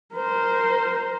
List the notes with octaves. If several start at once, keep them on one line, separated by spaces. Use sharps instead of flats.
A#4 C5